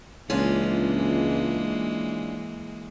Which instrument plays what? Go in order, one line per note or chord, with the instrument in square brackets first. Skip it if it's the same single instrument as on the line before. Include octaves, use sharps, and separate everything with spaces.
[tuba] C#2 [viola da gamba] E3 G#3 A#3 [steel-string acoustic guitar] C#4 D4 F4